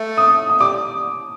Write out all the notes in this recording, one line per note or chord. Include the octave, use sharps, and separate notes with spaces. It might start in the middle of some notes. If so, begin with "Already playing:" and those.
Already playing: A3
D#6
D#6
G3 D6